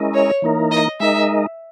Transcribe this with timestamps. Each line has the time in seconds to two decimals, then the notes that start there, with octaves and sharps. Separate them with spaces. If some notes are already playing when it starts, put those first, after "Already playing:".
Already playing: G#3 C#4 E4 A#4 D#5
0.14 C#5
0.42 E3 A#3 D#4 A#4
0.71 D#5
1.00 G#3 D#4 A#4 D#5 E5